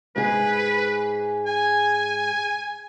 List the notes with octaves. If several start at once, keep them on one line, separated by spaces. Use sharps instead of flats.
G#2 G#4 B4
G#5